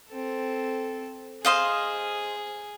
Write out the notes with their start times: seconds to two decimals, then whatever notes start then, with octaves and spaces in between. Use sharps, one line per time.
0.10 C4 A4
1.45 G#4 C5 D#5 F5